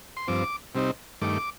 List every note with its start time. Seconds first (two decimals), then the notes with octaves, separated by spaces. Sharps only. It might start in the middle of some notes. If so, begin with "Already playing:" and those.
0.17 C6
0.28 G2 F3 C4 D6
0.75 C3 G3 C4 D#4
1.22 G2 D#3 A3 D6